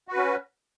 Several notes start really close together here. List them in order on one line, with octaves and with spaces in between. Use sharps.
F#4 B4 C#4